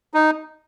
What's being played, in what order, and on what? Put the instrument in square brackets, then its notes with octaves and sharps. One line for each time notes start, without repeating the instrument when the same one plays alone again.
[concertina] D#4